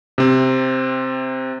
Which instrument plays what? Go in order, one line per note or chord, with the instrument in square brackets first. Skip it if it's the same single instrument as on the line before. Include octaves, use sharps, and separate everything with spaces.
[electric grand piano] C3 C4